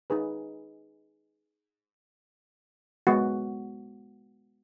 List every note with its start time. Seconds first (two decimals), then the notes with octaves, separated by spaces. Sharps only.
0.10 D#4 G#4 B4
3.07 G#3 B3 F#4